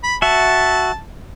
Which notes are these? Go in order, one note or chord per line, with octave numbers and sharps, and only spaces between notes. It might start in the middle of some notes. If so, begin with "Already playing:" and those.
B5
F#4 E5 A5